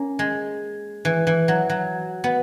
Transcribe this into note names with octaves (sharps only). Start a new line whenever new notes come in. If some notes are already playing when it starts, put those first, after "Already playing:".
Already playing: A#3 C#4
G#3
E3
E3
F#3
F#3
B3